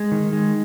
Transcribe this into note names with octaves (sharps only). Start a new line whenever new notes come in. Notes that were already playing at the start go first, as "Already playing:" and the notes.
Already playing: G#3
D#3
G#3